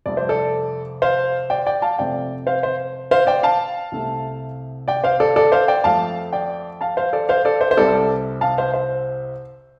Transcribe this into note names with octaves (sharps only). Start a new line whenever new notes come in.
F1 F2 C3 G3 C4 D5
C5
A4 D5
C5 F5
D5 G5
D5 G5
F5 A5
F2 C3 A3 C4 D5 G5
C5 F5
C5
C5 F5
D5 G5
F5 A5
C2 C3 A3 C4
D5 G5
C5 F5
A4 D5
A4 D5
C5 F5
D5 G5
F2 F3 A3 F5 A5
D5 G5
F5 A5
C5 F5
A4 D5
C5 F5
A4 D5
C5
C5
C2 C3 G3 C4 A4 D5
F5 A5
C5 F5
C5